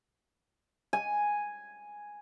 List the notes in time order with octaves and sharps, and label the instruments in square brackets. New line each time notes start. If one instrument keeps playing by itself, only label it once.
[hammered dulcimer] G#5